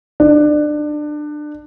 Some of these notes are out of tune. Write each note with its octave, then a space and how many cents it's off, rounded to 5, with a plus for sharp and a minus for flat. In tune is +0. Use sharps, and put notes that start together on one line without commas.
D4 +25